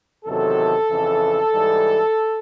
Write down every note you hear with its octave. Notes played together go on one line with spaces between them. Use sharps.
E2 C3 D#3 F#3 A4
F2 C#3 E3
G#2 E3 G3